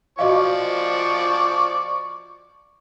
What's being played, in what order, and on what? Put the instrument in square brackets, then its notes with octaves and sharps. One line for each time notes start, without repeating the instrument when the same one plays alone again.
[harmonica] F3 D5 C#6 [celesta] F#4 D#5 F5